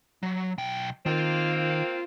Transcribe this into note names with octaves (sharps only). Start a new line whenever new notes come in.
F#3
B1 G5
D#3 A#3 C4 F4